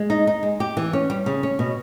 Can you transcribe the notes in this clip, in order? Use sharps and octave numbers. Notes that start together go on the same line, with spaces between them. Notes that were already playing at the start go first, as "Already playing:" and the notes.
Already playing: G#3
D#4
D#4
G#3
G4
E3
C#4
G3
C#3
C#4
B2